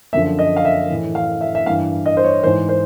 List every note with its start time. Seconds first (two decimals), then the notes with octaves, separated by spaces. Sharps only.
0.13 F#2 D3 F3 E5
0.39 D#5
0.56 F5
0.65 E5
0.90 A2 E3
1.15 F5
1.41 E5
1.55 E5
1.66 G2 E3 F5
2.06 D#5
2.17 C5
2.24 C#5
2.43 E3 C5
2.47 G#2
2.69 C5